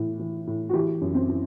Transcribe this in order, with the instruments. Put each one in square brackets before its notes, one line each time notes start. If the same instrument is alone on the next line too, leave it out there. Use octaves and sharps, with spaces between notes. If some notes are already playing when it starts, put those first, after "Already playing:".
Already playing: [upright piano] A2 E3
E3
A2
F#4
E3 G4
F#2
C4
E3